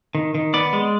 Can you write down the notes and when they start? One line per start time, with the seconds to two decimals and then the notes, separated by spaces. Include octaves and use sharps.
0.15 D#3
0.35 D#3
0.54 B3 D5
0.73 G#3